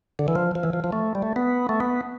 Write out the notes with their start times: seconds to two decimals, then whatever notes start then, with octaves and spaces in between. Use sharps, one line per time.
0.19 D3
0.28 E3
0.36 F3
0.55 F3
0.63 E3
0.73 F3
0.84 F3
0.92 A3
1.15 G3
1.22 A3
1.36 B3
1.69 A3
1.80 B3